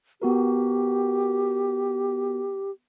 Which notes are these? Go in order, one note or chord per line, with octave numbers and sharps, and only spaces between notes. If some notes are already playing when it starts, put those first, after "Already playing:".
B3 F#4 G4 A#4